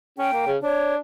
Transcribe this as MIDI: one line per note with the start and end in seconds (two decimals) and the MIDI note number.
0.19 0.29 61
0.19 0.50 79
0.33 0.46 58
0.47 0.57 49
0.63 0.98 62
0.63 0.94 73